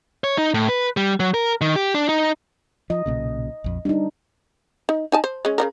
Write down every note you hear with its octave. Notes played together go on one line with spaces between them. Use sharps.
C#5
D#4
A2
B4
G3
F#3
A#4
D#3
G4
D4
D#4
F3 D#5
B1 A#2 C#3
A#1 F2
G3 D4 D#4
D#4
D#4 G#5 A5
C5
G#3 C#4
C#3 F#3 A#4